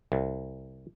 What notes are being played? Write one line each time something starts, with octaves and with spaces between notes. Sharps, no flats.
C2